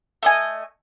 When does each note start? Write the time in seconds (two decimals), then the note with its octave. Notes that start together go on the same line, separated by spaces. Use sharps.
0.23 A3 D#5 G#5